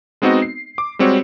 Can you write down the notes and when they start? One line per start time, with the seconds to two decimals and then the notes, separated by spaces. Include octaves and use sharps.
0.22 G#3 B3 C4 D#4 F#4 D#5
0.42 C7
0.78 D6
0.99 G3 G#3 C4 F#4 G4 C#5